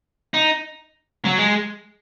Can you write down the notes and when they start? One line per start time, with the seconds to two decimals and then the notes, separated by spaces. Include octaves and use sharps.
0.34 D#4
1.25 F#3
1.38 G#3